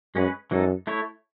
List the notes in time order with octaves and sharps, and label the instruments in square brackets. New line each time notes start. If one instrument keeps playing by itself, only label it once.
[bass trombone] F#2 [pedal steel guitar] G#3 C#4 G#4 B4
[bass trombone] F#2 [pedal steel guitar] E3 G#3 D#4 A4
[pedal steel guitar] A3 E4 A4 C#5